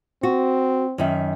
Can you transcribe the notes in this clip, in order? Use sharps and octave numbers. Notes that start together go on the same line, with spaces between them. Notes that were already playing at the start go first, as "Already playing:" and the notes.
C4 F#4
F#2 D#3 E5